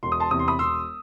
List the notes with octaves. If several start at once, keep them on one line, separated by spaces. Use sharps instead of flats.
E1 C6
D#6
A5 C6
E2 C3 D#6
C6
B5 D#6
E1 C6 E6